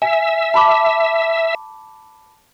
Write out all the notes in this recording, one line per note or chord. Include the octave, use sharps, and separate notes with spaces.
E5 G#5
A5 B5 D6